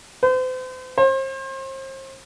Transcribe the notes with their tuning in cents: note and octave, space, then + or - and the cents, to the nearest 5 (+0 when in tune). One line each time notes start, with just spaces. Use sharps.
C5 -40
C5 +35